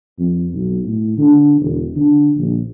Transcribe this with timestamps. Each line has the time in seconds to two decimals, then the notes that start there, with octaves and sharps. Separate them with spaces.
0.19 F2
0.54 B1
0.86 A2
1.18 D3
1.61 E1
1.96 D3
2.37 A#1